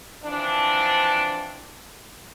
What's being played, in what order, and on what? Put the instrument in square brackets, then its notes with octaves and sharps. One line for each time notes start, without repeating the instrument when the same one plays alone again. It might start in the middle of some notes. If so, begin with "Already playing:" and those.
[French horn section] E3 F3 C4 D4